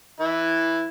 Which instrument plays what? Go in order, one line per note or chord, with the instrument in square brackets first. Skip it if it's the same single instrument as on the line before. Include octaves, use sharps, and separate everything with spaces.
[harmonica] E3 E4